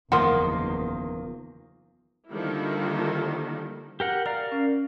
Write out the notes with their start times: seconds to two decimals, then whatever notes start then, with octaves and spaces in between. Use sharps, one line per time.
0.12 F#1 E2 D#3 F3 A#3 A#4 F#5 C6
2.30 D3 D#3 F3 G3 A#3 E4
4.00 G4 A#4 F#5
4.26 A#4 D5 F5 A#5
4.52 C#4